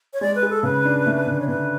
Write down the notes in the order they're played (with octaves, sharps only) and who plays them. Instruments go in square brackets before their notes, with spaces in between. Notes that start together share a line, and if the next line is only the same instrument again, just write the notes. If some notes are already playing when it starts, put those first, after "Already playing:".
[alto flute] C#5
[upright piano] G#3 [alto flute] D5
[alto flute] B4
[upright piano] G#4
[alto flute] A4
[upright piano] C#3 [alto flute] B4
[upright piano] D4
A3
D3
[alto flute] C#5
[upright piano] D3 [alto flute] B4